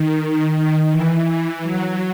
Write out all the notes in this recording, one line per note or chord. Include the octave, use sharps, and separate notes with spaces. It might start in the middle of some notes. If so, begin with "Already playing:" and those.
Already playing: D#3
E3
E3
F#3